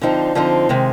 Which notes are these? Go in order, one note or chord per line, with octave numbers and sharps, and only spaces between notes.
D3 F3 C4 D#4
D3 F3 C4 D#4
C3 D#3 G#3